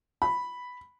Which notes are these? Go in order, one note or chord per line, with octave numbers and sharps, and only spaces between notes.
B5